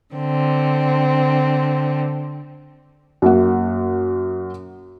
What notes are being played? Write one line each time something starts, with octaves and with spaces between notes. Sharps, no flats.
D3 C4
F#2 A#3 F#5